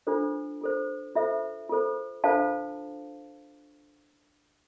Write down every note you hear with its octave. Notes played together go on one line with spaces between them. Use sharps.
D4 F4 A4 C5
F4 A4 C5
F4 A4 C5 E5
F4 A4 C5
D4 F4 A4 C5 F5 A5